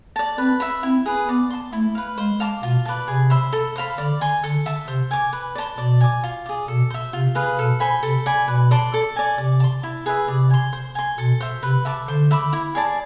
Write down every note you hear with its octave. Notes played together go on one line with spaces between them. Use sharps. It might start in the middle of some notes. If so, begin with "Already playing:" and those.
D5 A5
C4 B4
E5 B5
C4 E4
G#4 B4
B3 D5
A5 C6
A3 E4
B4 F5
G#3 C5
F5 A5 D6
B2 F4
B4 D5 A5
C3 G#4
C5 E5 B5
A4
C5 F5 B5
D3 D5
G#5 C6
D3 A4
E5 A5
C3 C5
G#5 D6
B4
D5
A5 C6
B2 D5
G#5 D6
F4
G#4 D5
B2 A4
C5 E5
C3 F4
G#4 B4 F5
B2 A4
C5 G#5 B5
C3 A4
D5 G#5 B5
B2 B4
D5 A5 C6
A4
D5 G#5
C3 D5
A5 C6
E4
G#4 B4 E5
C3 D5
G#5 C6
C5
G#5 C6
B2 A4
C5 E5
C3 B4
E5 A5 D6
D3 C5
E5 B5 D6
E4
G#4 D5 A5